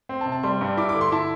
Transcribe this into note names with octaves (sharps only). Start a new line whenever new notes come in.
C4
A5
C3
A5
G3 C6
G2
E4 D6
D6
D3
C6
E4 A5